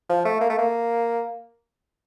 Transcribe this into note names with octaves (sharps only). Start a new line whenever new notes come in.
F3
A3
A#3
A3
A#3